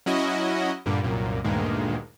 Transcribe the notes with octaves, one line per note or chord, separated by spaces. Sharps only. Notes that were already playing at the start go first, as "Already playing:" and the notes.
F#3 C#4 E4 F#4 D#5
G2 A#2 D3 G3
C2 F#2 A#2
D2 G2 A#2 D#3 G#3